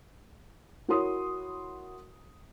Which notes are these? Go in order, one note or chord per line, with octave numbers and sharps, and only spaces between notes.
E4 F#4 A#4 C#5 C6 D#6